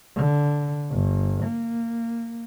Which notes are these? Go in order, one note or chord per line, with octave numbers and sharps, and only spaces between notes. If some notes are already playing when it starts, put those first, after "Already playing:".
D3
G1
A#3